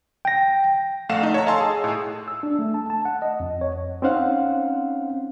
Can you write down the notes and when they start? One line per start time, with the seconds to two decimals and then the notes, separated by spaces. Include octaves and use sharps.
0.25 G5 A#6
1.09 A#1 A3 F5 F#5 E7
1.23 A3 D#4
1.34 C#5 A5 A#5
1.46 D#5 F5 G#5 A5 C6 E6
1.60 G#4
1.84 A2 G#4
2.28 E6
2.43 D4
2.59 A3
2.74 A5
2.90 A5
3.05 F#5
3.22 D#5
3.40 F2
3.61 C#5
4.02 C4 C#4 D#4 C5 F5 F#5